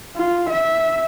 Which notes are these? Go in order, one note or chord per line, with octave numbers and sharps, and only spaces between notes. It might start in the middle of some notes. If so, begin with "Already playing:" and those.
F4
E5